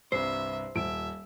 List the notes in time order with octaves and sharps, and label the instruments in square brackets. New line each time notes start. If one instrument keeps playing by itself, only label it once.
[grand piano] C2 G2 C3 [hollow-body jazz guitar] C5 [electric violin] E5
[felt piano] D#1 [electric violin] E5 [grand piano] D7